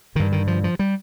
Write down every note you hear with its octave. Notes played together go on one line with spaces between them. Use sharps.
G2 D3 D#3
D#3
F3
F3
G3